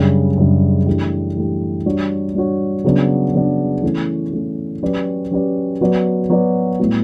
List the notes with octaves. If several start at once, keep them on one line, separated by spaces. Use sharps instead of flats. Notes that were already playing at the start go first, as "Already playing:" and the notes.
Already playing: F#2 C#3 G3 D4
F#2 C#3 G3 D4
E3 A3 D4 G4
E3 A3 D4 G4
G3 D4 F#4 C#5
G3 D4 F#4 C#5
C#3 F#3 B3 D4
C#3 F#3 B3 D4
E3 A3 C#4
E3 A3 C#4
F#3 C#4 G4 B4 D5
F#3 C#4 G4 B4 D5
F#3 B3 F#4 B4 D5
F#3 B3 F#4 B4 D5
A2 G3 B3 F#4